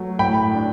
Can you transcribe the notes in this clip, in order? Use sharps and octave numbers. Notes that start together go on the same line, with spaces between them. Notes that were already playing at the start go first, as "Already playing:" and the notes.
Already playing: F#3 A3
A2 G5 B5
D4